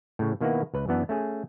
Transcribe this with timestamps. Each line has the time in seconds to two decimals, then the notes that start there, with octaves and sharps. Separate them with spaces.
0.19 A2 C#3
0.41 B2 D#3 A#3 E4 F#4 B4
0.74 C#2 B4
0.88 F#2 E3 B3 D4
1.09 A3 C#4 G#4